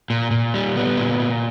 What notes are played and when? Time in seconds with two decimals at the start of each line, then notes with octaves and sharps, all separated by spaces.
0.10 A#2
0.31 A#2
0.54 G3
0.76 B3
0.97 A#2
1.20 A#2